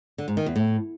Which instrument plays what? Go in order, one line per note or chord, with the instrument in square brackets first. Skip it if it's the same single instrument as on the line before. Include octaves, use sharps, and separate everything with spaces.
[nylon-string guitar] D3
G#2
D#3
E2
A2